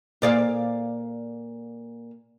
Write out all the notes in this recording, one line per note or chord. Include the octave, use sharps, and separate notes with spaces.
A#2 D5 F5